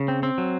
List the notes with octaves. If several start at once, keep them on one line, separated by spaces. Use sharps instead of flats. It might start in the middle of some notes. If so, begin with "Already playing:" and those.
Already playing: C#3
C4
C4
F#3